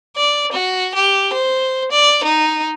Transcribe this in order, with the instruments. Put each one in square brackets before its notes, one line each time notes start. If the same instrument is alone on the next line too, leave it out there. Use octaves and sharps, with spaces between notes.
[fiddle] D5
F#4
G4
C5
D5
D#4